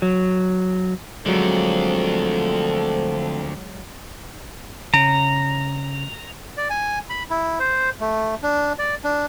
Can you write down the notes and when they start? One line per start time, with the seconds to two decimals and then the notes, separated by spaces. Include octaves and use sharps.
0.02 F#3
1.26 D2 D3 F3 F#3 G#3 C4 A4
4.94 C#3 A#5
6.57 D5
6.70 G#5
7.10 B5
7.30 E4
7.60 C5
8.01 A3
8.42 D4
8.79 D5
9.04 D4